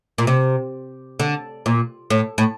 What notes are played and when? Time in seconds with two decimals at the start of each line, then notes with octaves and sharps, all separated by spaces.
0.18 A#2
0.27 C3
1.19 D3
1.66 A#2
2.10 A2
2.38 A2